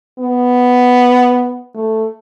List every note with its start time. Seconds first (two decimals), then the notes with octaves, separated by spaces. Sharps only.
0.19 B3
1.75 A3